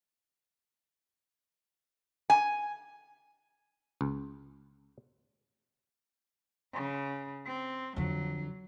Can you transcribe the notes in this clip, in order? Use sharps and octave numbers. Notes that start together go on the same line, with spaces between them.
G#5
C#2
C#3
C4
F2 D3 F#3